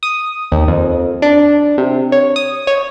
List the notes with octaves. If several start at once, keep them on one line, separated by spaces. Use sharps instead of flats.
D#6
D#2
F2
D4
C3
C#5
D#6
C#5